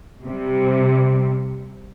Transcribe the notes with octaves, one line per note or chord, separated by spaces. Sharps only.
C3 G3